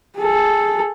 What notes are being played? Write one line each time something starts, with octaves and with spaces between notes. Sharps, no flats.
G#4 A4